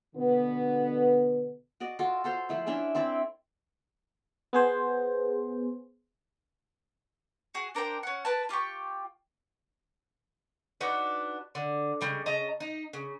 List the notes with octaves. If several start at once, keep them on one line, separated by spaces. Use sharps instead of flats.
B2 D3 B3
F#4 D5 D#5
F4 F#4 A4
F#4 A4 C5 C#5
F3 A3 E4
A3 C#4 D4 E4
C4 E4 D5 E5
B3 G#4 C5
F#4 G#4
D4 A#4 C5 G5
C#4 F#5
A#4 B4 A5
F4 G4 G5 C#6
D4 D#4 F#4 B4
D3
C#3 G3 G#3
C#3 D#5 A5 A#5
D#4
C#3